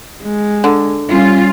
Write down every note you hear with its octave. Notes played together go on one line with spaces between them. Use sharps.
G#3
D3
G3 C#4 F4